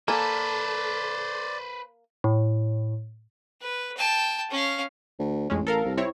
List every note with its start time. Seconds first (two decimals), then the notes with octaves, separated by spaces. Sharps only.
0.08 A#3 A4 B4 C5 D5 G#5
2.24 A2
3.61 B4
3.97 G5 A5
4.51 C#4 F5
5.19 D2
5.50 A1 F2 G#3 C#4
5.67 A4 A#4 F5
5.85 C2
5.97 C4 E4 C#5